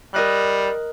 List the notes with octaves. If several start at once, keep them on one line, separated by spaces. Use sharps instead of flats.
G3 A#4 D#5 F#6